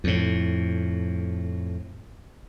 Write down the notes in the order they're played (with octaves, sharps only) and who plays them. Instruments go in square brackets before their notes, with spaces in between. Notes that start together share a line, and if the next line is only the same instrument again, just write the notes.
[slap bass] F2 A2